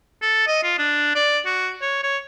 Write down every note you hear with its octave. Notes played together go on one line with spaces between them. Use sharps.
A4
D#5
F4
D4
D5
F#4
C#5
C#5